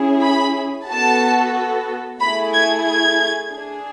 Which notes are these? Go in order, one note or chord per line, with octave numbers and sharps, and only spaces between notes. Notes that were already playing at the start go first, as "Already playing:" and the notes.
Already playing: C#4 E4 G#4
B5
B3 F#4 A4 A5
A3 E4 G#4 B5
G#6
G#6
D4 G#4